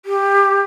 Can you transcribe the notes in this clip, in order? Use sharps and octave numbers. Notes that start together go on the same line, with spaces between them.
G4